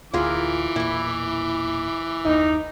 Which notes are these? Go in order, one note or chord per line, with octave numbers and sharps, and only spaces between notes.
D1 D2 E3 F4 G#4 A#4 D6
E1 A#2 E4 C#6
F#1 D#2 D#4